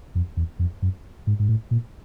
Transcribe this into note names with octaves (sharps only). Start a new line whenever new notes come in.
F2
E2
F2
F#2
G#2
G#2
A2
A#2